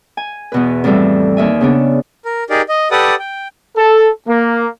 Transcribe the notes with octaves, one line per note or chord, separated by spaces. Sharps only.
G#5
E2 B2 B4
F2 A2 E3 G3 A4
D#2 E5 G#5
C#3 B3 D4
A#4
D#4 G4 G#4 A#4 D5
D#5
G4 A4 B4 D5 F#5 D#6
G5
A4
A#3